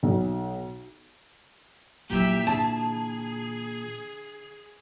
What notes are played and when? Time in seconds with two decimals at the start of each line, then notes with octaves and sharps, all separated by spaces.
0.03 B1
2.10 G1 A#2 E3 F#3 G4 E5
2.47 D3 G#4 A5